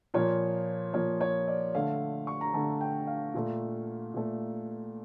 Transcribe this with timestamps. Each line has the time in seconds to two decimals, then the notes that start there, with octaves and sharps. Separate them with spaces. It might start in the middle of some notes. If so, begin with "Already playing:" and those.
0.14 A#2 F3 A#3 C#5
0.94 A#2 F3 A#3 C#5
1.21 C#5
1.48 D5
1.75 D3 A3 F5
2.27 C#6
2.41 A#5
2.54 D3 A3 A5
2.81 G5
3.07 F5
3.34 A#2 A3
4.14 A#2 A3